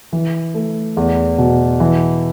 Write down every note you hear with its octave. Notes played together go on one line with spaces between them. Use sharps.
E3
A3
E2
B2
E3